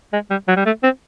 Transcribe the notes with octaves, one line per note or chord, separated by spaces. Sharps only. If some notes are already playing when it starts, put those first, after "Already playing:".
G#3
G3
F#3
G3
A3
C4